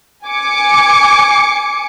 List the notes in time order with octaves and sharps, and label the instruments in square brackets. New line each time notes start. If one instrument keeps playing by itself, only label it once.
[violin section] G#5 D6 C#7